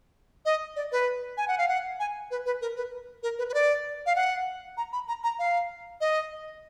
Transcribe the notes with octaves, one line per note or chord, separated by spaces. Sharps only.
D#5
D5
B4
G#5
F#5
F5
F#5
G#5
B4
B4
A#4
B4
A#4
B4
B4
D5
F5
F#5
A#5
B5
A#5
A#5
F5
D#5